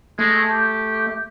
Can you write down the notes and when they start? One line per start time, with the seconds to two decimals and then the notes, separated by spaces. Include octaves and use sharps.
0.19 G#3 A3
0.51 G4